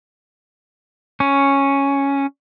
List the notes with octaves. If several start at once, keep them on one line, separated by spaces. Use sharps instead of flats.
C#4